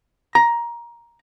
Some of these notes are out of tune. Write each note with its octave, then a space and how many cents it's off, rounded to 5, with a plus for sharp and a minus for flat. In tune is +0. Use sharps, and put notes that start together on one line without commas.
A#5 +15